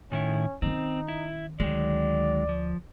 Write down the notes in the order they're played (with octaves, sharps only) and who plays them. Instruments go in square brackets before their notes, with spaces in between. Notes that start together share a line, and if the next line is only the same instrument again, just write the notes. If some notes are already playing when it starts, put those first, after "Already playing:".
[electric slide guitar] A2 D#3 E4 [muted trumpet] C#4
[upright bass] D#3 C#4 [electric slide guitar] C4 [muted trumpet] D#4
[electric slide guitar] E4
[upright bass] D2 [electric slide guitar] D#3 F#3 G#3 [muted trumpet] D5
[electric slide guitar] F3